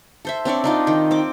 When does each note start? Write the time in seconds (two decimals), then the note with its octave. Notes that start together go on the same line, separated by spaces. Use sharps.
0.25 A4 C5 E5
0.45 C4 D4 C#5 D5
0.64 D4 D#4 F4
0.87 D#3 G5
1.11 C4 D6